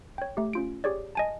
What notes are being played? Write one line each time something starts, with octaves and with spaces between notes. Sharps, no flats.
C#5 G5
A3 G4
C#4 F4 D7
G4 G#4 C#5 D5
D#5 G#5 A5